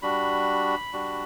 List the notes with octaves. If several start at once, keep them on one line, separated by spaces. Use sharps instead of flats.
G3 D4 F#4 B5
G3 D4 F#4